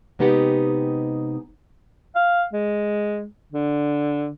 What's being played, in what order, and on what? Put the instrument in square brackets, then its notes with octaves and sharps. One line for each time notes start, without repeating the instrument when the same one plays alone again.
[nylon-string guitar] C3 G#3 B3 D#4 G4 F#5
[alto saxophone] F5
G#3
D3